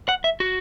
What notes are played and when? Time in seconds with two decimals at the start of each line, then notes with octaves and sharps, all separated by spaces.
0.09 F#5
0.24 E5
0.40 F#4